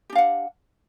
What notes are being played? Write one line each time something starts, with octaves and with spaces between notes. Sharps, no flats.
D4 G4 F5 F#5